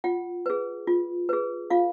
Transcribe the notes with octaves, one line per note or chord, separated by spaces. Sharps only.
F4 F#5
G#4 B4
F4
G#4 B4
F4 F5